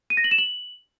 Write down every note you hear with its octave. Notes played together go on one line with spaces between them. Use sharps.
D#7
A#6
F#7
E7
F#7